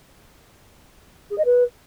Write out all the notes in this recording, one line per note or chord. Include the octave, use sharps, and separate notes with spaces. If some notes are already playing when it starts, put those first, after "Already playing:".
G#4
D#5
B4